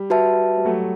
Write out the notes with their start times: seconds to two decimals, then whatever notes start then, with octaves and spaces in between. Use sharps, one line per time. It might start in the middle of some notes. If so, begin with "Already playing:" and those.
Already playing: G3
0.10 F#4 B4 E5 A5
0.57 G3
0.65 F#3 A3